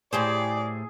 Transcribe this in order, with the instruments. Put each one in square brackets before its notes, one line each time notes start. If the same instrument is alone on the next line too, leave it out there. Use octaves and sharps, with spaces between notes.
[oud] A2 G4 C5 [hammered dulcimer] G#4 [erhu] D5